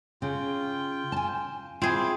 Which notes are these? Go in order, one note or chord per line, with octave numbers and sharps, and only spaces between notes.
C#3 F4 G5
G#5 A5
C4 E4 F4 G#4